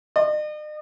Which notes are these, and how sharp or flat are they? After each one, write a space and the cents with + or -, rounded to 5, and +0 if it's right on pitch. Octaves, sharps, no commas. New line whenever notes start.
D#5 -45